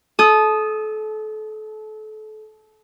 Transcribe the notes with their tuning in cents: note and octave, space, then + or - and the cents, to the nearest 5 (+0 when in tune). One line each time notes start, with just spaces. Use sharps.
A4 -30 D#6 +0